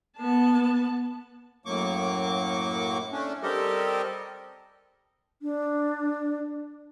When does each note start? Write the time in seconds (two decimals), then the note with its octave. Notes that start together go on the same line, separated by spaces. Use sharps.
0.17 B3 A5
1.66 F#2 A2 F#3 A#3 C#6 D6
3.12 A3 C#4 D4
3.43 G3 C4 G4 A4 A#4 D#5
5.42 D4